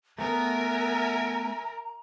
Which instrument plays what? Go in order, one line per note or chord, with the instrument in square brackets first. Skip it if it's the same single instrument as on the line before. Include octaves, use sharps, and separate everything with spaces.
[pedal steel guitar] A3 B3 [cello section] A#4 [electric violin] E5 G#5 [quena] A#5